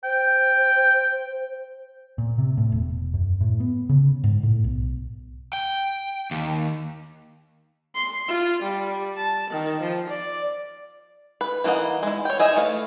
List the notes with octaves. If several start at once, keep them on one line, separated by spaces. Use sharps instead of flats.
C5 G5
A#2
C3
A2
E1
F#2
A2
B3
C#3
G#2
A2
B1
G5
D#2
C6
F4
G3
A5
D#3
F3
D5
B4
E3 A#3 D#4 D#5 F#5
G#3 E4
C#5 G5
G#4 D#5 E5 G#5
E3 A3 F5